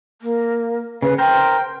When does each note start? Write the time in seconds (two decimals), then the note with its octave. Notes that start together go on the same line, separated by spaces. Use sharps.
0.22 A#3
1.02 C#3 B4
1.18 A#4 C5 G5